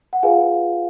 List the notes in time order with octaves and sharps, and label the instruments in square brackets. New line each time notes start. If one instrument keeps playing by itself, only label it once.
[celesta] F#5
F4 G#4 B4 F5 G#5